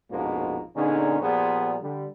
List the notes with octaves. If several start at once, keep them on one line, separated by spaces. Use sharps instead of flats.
A#1 F2 G#2 B2 F3 A#3
A#2 D3 B3 C#4 D#4 G#4
A#2 F3 G3 B3 G#4
D3 G3